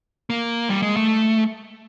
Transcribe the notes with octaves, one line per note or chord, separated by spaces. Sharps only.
A#3
G3
G#3
A3